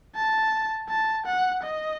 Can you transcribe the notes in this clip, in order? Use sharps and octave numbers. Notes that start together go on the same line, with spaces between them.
A5
A5
F#5
D#5